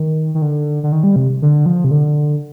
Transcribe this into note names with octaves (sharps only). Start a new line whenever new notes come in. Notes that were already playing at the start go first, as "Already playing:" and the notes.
Already playing: D#3
D#3
D3
D3
D#3
G3
C3
D3
F3
C3
D3